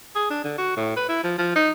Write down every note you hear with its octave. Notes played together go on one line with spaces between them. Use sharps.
G#4
D4
D3
F#4
A2
B4
E4
F3
F3
D#4